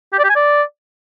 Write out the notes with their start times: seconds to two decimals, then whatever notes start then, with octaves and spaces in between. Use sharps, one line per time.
0.13 G4
0.19 D5
0.24 G4
0.30 G#5
0.36 D5